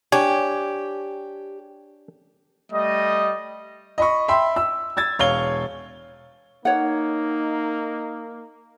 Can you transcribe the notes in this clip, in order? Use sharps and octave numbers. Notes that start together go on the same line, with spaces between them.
D4 G4 C#5 G#5
G3 A3 D#5
D#5 B5 C#6
E5 G5 B5 C6
E6
E6 G#6 A6
E1 C#5 F5 G#6 G7
A#3 D#4 C#5 F#5